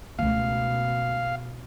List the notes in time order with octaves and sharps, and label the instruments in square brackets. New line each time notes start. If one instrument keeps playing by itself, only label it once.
[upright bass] C#2 A3 [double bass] B2 [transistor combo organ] F5